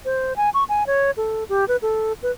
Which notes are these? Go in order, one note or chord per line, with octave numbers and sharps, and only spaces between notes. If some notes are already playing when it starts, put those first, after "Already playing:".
C5
G#5
C#6
G#5
C#5
A4
G4
B4
A4
B4